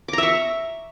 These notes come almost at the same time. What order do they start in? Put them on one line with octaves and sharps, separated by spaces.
D6 A#5 E5 C#6